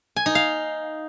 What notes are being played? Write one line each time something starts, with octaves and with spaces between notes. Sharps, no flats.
G#5
D#4
F5